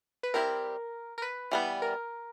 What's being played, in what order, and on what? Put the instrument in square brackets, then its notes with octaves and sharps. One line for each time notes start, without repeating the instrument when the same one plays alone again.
[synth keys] B4
[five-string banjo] G3 C4 E4 G4 [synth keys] A#4
[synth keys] A#4
B4
[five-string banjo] E3 G3 B3
[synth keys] A#4